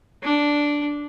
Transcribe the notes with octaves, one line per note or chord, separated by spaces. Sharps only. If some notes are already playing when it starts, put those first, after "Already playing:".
D4